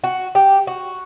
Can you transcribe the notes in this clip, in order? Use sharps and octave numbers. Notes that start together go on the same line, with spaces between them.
F#4
G4
F#4